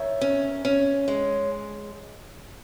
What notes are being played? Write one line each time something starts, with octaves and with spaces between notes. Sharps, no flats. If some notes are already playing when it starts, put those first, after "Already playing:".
Already playing: D#3 C#5 E5
C#4
C#4
G#3